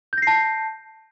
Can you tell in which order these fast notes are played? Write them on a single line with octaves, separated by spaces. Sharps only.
G6 A#6 C7 A5